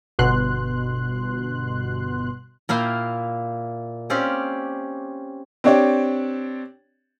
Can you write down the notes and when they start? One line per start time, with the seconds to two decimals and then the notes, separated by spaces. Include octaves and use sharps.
0.19 G1 B2 C6 F#6
2.69 A#2 A#3 E4 F5 G5
4.10 C4 C#4 G4 D5 F5
5.64 C4 D4 G4 C#5 D5